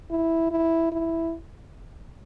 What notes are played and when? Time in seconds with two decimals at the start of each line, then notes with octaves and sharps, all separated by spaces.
0.10 E4
0.51 E4
0.92 E4